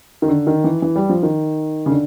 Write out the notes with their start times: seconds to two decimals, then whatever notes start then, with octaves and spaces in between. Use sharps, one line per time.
0.22 D#3
0.28 D3
0.47 D#3
0.64 E3
0.82 E3
0.96 G3
1.09 F3
1.23 D#3
1.86 C#3
1.91 D3